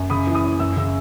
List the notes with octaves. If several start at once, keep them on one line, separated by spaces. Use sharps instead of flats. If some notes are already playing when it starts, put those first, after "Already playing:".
Already playing: F#2
C#3 B5 D#6
E3
B5 D#6
C#4
F#2 E6
C#3 E6